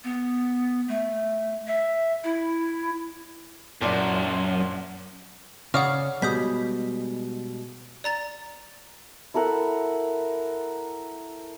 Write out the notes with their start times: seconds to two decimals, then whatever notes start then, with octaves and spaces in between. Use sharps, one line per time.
0.04 B3
0.88 A3
1.67 E5
2.24 E4
3.81 F#1 F#2 A#2 D5
5.74 C#3 C#5 D5 F5 F#5 D#6 F6
6.22 B2 G3 G#3 D#6 G6 B6
8.04 D5 A#5 A6
9.34 E4 A4 A#4 F#5